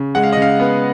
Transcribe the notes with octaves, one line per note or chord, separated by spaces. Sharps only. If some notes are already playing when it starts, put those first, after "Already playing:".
Already playing: C#3
G#3 F#5
F5
D#5
C#3
F5
B3